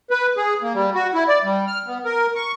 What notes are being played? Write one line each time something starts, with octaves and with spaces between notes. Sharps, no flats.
B4
G#4
A#3
G3
F#4
E4
D5
G3
F6
B3
A#4
C#6